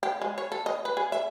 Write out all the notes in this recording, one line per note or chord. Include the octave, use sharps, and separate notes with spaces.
G4
G#3
C#5
A4
D#5
B4
G#4
E5